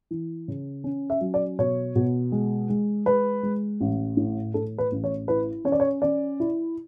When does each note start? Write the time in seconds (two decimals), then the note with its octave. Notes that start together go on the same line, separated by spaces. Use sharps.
0.11 E3
0.48 C#3
0.84 C#4
1.10 E5
1.21 F#3
1.34 D5
1.59 B2 C#5
1.96 B2
2.32 G#3
2.70 G#3
3.06 G#3 B4
3.43 G#3
3.81 A1
4.17 A2
4.54 A2 A4
4.78 B4
4.92 A1
5.04 C#5
5.28 E4 B4
5.65 C#4 C#5
5.72 D5
5.80 C#5
6.02 C#4 D5
6.40 E4